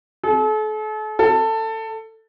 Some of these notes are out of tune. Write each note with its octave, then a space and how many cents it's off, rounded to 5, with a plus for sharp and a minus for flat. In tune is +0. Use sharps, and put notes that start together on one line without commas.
A4 -40
A4 +15